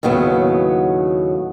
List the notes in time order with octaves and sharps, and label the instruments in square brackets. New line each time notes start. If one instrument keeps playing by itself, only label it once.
[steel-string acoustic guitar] D#2 A2 C#3 F#3 B3